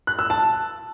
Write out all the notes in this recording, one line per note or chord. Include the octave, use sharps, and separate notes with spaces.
F#6
E6
A5